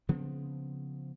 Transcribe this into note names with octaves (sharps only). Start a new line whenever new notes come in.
C#3 F3 B3 C4